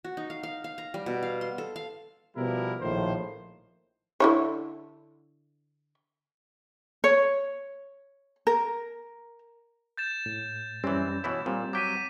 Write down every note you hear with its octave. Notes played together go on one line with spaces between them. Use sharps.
F#4
D#4
F5
F5
F5
A#5
G3
B2
F5
C6
A4
F5
B2 F3 G3 B3 E4 A#4
A#1 A2 D#3 F3 C5
D3 E4 C#5
C#5
A#4
G6 A6 E7
A2
F#2 E3 G3 C4 C#4
B2 E3 E4 C#5
A#2 G3 C4
F#3 G5 D6 B6 D#7